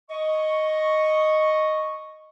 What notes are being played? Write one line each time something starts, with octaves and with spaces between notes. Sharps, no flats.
D#5 C#6